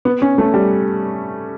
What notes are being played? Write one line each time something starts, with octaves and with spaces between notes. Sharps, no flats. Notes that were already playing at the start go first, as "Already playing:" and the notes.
B3
C#4
A3
G3